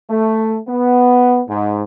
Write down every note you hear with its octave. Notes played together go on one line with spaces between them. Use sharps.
A3
B3
G#2